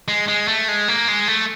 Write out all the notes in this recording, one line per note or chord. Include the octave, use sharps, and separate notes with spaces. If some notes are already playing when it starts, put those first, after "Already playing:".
G#3
G#3
A3
G#3
A#3
G#3
A3